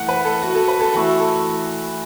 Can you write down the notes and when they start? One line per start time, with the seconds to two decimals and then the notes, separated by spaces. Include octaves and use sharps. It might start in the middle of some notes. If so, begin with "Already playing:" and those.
Already playing: E3 A3 F#5
0.09 B4
0.25 A4
0.42 F#4
0.55 A4
0.68 B4
0.81 A4
0.93 E3 A3 E4 F#4
1.20 A4